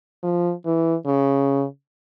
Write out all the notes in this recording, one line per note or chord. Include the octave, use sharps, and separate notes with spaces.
F3
E3
C#3